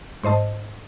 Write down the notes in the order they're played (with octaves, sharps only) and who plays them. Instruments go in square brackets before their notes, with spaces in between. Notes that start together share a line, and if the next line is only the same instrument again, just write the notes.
[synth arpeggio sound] G#2 C5 D#5 A5